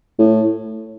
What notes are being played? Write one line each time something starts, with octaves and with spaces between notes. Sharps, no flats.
A2